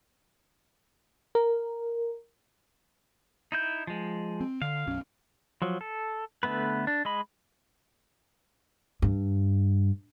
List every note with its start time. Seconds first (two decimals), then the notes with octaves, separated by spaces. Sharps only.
1.35 A#4
3.52 D#4 E4 G6
3.87 F3 G#3
4.41 C4
4.62 D3 F5
4.87 B1 F#2 C#4
5.62 F3 F#3
5.81 A4
6.43 D3 A3 B3 B4
6.87 D4
7.05 G#3 D#5 B5
9.02 G2